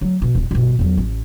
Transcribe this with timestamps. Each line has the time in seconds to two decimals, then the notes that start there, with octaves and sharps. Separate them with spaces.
0.01 F#3 A3
0.22 B2
0.35 D1 E2
0.51 G1 B2
0.79 E2 F#3
0.97 A1 C#4